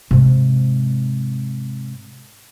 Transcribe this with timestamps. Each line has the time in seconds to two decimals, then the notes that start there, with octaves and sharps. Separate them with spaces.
0.11 G#2 C3